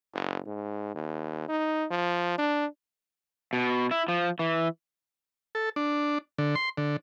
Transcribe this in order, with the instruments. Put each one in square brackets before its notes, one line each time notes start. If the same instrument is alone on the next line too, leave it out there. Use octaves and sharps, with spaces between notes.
[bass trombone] F#1
G#2
D#2
D#4
F3
D4
[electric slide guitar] B2
E4
F3
E3
[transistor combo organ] A4
D4
D3
C6
D3